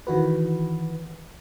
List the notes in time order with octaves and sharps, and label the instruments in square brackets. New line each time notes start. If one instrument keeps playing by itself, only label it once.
[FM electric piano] D#3 E3 F#4 B4